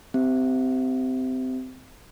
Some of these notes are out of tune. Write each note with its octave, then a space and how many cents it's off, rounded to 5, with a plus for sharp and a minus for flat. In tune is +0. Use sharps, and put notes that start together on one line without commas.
C4 -25 G4 -10 E5 +0